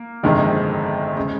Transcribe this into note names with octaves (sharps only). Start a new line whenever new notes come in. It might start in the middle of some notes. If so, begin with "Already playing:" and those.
Already playing: A#3
G1 F2 C3 D#3 G#3
C#3 G#3